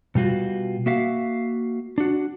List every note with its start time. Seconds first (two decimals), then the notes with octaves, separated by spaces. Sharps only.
0.15 B2 G3 F4 F#4
0.86 A#3 F#4 E5 F5
1.98 D4 F#4